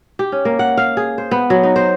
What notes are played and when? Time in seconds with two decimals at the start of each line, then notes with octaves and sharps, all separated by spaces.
0.19 G4
0.32 C#4
0.45 A#3
0.59 F#5
0.77 F5
0.97 G#4
1.18 C5
1.31 B3
1.50 F#3
1.63 D#4
1.76 C5